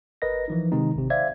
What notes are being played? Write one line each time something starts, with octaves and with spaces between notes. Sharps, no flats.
G1 A#4 B4 D#5 A#6
E3 F3 D#4
C3 D#3 G#3 C4 D#4
G#1 C3
C5 D5 E5 F5 G#6